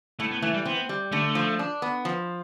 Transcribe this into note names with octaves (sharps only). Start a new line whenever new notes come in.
A2 A3
B3
E3 A3
G3
B3 C4
G3
D3 A3
F3
D4
B3
F3